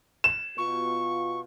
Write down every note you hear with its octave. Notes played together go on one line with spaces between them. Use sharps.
E7
B2 F4 C#6